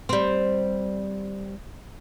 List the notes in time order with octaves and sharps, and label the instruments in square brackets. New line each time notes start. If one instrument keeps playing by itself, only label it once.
[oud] G3 C4